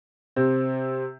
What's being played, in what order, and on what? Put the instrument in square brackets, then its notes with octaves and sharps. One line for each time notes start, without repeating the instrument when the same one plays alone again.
[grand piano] C3 C4